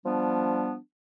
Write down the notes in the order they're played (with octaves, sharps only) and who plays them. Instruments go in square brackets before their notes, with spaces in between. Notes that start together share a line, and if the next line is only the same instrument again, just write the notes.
[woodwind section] F3 G3 B3 D4